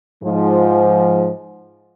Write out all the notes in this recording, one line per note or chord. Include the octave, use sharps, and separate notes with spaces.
G#2 F3